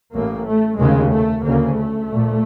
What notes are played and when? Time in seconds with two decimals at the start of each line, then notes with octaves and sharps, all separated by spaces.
0.12 A1 A2 A#3
0.45 A3
0.78 F1 D#2 C#3 G#3
1.11 A3
1.44 D2 C#3 A#3
1.77 A3
2.10 A#1 A#2